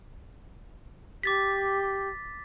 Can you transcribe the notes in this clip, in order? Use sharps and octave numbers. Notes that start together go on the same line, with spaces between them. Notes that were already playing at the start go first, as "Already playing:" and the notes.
G4 D6 A6 B6